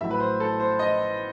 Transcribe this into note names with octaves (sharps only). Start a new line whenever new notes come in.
A1 A2 F#3 E5
B4
C5
A4
C5
D#5